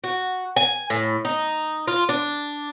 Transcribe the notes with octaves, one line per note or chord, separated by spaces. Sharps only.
F#4
G#5
A2
D#4
F4
D4